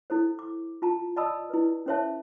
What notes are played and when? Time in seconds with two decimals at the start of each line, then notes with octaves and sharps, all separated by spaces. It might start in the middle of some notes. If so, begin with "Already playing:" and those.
0.10 E4 A4 C5
0.39 D6
0.82 F4 A5 A#5
1.16 D5 D#5 A5 B5 D#6 E6
1.50 E4 B4
1.86 C#4 A4 C5 C#5 E5 A5